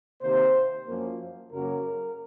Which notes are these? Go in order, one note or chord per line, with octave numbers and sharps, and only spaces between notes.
C3 D#3 A#3 C5
F#2 F3 A#3
F#2 C#3 F#3 A#3 A#4